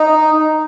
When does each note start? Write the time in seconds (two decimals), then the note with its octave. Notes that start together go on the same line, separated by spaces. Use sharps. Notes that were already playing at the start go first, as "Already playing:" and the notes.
Already playing: D#4